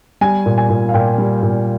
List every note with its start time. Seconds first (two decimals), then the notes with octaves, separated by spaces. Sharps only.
0.21 G3 G#5
0.46 A#2
0.58 G#5
0.70 A#2
0.89 F5
0.94 A#2 G5
1.18 G3
1.43 A#2